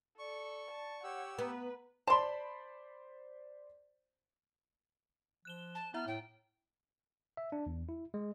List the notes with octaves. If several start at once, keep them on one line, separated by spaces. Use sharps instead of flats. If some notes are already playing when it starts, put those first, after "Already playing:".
A4 D5 C#6
A5
G4 C#5 F#5 E6
B3 B4 A#5
C5 D5 A5 B5 C6
F3 F#6 E7 G7
A5
B3 E4 E5 A#5 F6
A2 G5
E5
D4
E2
E4
G#3